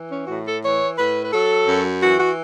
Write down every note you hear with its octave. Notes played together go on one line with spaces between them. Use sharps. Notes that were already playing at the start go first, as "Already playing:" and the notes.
Already playing: E3
C#4
A2 F#4
A4
E3 C#5
A2 B4
B4
F#3 A4
F#2
E3 F#4
F#4